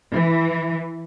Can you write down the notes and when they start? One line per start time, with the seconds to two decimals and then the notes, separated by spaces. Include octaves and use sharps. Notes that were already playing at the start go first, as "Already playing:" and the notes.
0.14 E3